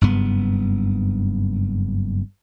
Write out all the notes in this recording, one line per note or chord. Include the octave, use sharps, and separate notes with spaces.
F#1 G2 B3